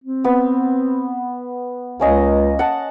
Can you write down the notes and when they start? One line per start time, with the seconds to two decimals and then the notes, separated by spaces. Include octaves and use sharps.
0.04 C4
0.24 B3
2.00 C#2 A#3 C#4 D#5
2.59 F#5 A5